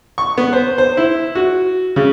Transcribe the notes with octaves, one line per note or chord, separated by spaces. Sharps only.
C#6
B3
C5
C5
E4
F#4
C#3